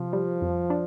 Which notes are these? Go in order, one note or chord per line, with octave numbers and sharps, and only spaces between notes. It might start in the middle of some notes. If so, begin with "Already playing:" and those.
Already playing: C3 F3
G3
F2
D4